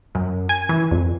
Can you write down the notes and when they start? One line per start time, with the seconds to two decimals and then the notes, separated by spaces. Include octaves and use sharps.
0.15 F#2
0.49 G#5
0.69 E3
0.91 F2